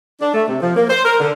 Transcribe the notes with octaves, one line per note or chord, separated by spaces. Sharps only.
D4
A3
C3
F3
A#3
C5
A#4
D3